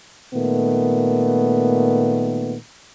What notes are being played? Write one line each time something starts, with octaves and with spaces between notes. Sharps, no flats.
A#2 D#3 A3 B3